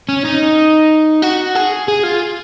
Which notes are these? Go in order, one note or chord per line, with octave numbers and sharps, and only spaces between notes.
C#4
D#4
F#4
G#4
G#4
F4